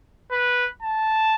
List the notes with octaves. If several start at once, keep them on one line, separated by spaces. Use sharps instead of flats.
B4
A5